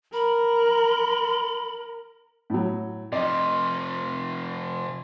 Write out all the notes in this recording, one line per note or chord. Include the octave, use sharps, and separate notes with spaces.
A#4 B5
A2 F#3
C3 F3 D5 D#5